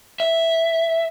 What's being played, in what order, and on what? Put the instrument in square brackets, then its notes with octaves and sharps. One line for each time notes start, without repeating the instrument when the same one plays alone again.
[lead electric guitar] E5